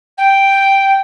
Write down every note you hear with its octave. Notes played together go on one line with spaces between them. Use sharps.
G5